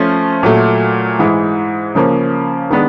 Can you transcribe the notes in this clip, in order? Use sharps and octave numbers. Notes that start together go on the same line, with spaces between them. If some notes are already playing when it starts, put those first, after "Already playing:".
Already playing: F3 A3 C#4 F4
A#2 F#3 A3
G#2 E3 G#3
C#3 F3 A#3 C#4
D#3 G#3 B3 D4